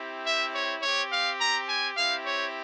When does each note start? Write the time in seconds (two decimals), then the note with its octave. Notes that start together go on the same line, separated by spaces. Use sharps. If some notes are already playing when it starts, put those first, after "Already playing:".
Already playing: C4 E4 G4
0.25 E5
0.54 C#5
0.82 C4 G4 C#5
1.10 F5
1.39 A#5
1.67 G#5
1.96 C4 E4 G4 F5
2.24 C#5